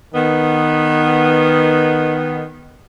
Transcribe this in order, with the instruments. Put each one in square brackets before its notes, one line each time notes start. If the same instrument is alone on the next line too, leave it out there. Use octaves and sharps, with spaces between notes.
[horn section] D#3 B3